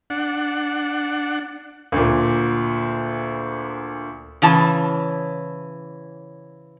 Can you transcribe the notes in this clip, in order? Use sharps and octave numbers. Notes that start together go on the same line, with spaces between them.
D4 F#5
D2 A#2
C#3 E3 A5